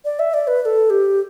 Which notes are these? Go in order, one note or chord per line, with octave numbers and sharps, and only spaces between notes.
D5
E5
D5
B4
B4
A4
G4